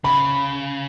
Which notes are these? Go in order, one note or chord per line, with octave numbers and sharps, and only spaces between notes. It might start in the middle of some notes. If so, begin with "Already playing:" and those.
C#3 B5